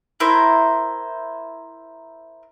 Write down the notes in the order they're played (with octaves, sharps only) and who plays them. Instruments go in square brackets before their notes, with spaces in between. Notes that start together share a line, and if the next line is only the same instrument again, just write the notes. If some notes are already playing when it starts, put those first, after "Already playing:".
[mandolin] E4 A#4 C5